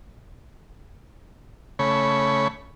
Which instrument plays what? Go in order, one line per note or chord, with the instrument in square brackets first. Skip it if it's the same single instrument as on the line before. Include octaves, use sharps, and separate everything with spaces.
[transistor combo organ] C#3 A3 C#5 B5